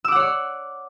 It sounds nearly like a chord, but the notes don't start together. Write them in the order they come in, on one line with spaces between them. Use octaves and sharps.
E6 D6 F#5 C#5 D5